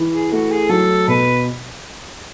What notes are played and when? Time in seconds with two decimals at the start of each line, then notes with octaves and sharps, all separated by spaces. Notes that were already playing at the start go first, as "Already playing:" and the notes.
Already playing: E3
0.12 G#4
0.31 A3 F#4
0.51 G#4
0.69 F#3 A4
1.08 B2 B4